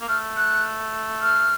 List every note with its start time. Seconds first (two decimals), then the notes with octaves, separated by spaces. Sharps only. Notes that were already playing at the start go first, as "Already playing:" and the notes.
0.01 A#3
0.08 A3 F6
0.37 F#6
1.21 F6